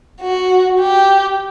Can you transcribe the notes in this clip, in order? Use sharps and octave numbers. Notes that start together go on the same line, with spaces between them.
F#4
G4